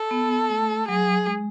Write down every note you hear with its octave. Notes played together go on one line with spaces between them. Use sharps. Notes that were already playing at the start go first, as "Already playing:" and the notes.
Already playing: A4
B3
A3
F#3 G#4
G#3